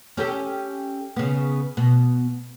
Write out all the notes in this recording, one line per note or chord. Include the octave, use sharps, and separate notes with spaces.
C#4 G4 A4
C#3 B3
B2